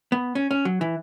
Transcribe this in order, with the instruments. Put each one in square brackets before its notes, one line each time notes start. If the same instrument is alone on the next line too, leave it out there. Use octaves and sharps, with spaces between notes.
[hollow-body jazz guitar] B3
C#4
C#4
F#3
E3